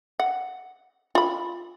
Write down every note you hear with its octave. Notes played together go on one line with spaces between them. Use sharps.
F#5
F4 B5